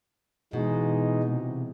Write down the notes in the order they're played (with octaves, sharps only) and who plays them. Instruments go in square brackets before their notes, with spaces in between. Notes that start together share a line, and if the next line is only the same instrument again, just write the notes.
[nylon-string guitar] B2 [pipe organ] E3 G#3 D#4
[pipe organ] C3